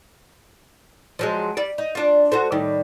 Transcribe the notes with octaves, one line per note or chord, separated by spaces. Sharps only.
F3 F#3 G#3
G3 D5
D#4
D4 F4
F#4 A4 C5
A2 D#3 G3